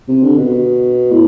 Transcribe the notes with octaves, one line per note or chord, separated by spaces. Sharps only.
C3
D3
B2
A2